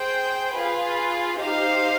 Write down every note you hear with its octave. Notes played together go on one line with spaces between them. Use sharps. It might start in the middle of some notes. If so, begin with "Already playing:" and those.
Already playing: G#4 C5 G5
F4 G#4 B4
D#4 G4 C5 F5